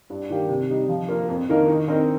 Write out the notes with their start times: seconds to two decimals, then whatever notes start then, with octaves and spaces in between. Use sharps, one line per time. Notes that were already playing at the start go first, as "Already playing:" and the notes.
0.10 G2
0.30 D#3 A#3 G4
0.49 C3
0.70 G3 D#4
0.89 F3
1.09 A#3 F4 A#4
1.29 F2
1.49 D#3 A#3 D#4 A#4
1.68 D#3
1.88 C4 D#4 A#4